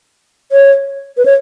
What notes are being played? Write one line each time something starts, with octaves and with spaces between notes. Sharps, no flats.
C#5
B4
C#5